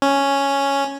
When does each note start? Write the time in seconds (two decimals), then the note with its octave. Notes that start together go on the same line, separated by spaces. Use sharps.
0.02 C#4